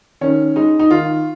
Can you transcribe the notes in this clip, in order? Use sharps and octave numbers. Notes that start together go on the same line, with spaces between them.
D#3 C#4
G#3 D#4
D#4
D#3 F4